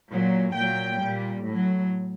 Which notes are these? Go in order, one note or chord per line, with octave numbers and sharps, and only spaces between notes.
A#2 F#3
A#2 F#3 G5
A#2 G3
A2 F#3